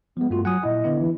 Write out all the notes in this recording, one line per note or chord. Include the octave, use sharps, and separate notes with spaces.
F3 G#3 B3
G2 A3 F4 F#4
F#3 F#5 G#5 D#6
A#2 E4 D#5
D3 B3 E4
E3